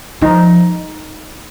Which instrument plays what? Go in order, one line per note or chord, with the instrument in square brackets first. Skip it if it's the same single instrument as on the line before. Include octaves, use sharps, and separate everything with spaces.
[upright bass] F3 [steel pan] D#4